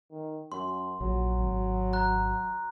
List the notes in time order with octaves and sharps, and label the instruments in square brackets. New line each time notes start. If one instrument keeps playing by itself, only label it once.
[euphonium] D#3
[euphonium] F#2 [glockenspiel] C6
[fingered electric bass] A#1 [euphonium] F#3
[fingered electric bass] G#1
[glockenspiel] A#5 F#6